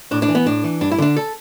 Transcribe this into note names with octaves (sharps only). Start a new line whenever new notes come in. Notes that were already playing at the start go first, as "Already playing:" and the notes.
A2 D4
D4
E3
B3
A2 D4
E3
G2 D4
E4
D3 D4
A4